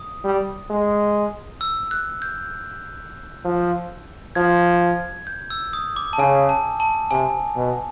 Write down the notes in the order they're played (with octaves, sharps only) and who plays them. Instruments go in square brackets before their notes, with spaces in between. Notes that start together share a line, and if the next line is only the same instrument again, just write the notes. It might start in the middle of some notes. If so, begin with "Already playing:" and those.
Already playing: [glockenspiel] D#6
[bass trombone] G3
G#3
[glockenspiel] E6
F#6
G6
[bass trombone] F3
[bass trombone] F3 [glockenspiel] G#6
[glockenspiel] G6
E6
D#6
D6
A5
[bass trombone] C#3 [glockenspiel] G#5
[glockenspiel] A5
A5
[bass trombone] C3 [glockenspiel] G#5
[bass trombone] B2